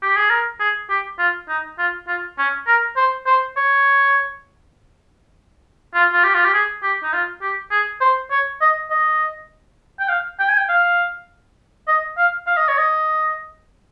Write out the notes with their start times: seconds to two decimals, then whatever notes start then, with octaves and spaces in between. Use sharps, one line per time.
0.02 G4
0.16 G#4
0.30 A#4
0.60 G#4
0.90 G4
1.19 F4
1.49 D#4
1.79 F4
2.08 F4
2.38 C#4
2.67 A#4
2.97 C5
3.26 C5
3.57 C#5
5.95 F4
6.13 F4
6.24 G4
6.34 F4
6.45 G4
6.54 G#4
6.83 G4
7.03 D#4
7.13 F4
7.42 G4
7.71 G#4
8.01 C5
8.31 C#5
8.61 D#5
8.91 D#5
10.00 G5
10.09 F5
10.40 G5
10.49 G#5
10.58 G5
10.69 F5
11.88 D#5
12.18 F5
12.47 F5
12.57 D#5
12.68 C#5
12.78 D#5